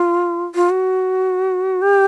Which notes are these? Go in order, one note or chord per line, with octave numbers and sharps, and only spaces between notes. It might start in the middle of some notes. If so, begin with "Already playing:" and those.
Already playing: F4
F4
F#4
G4